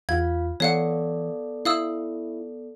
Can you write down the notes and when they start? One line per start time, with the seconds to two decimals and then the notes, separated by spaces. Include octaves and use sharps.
0.09 E2 F4 F5 G#6
0.60 E3 B3 A4 C#5 D5 F5 F#5
1.65 E4 F5 D#6 E6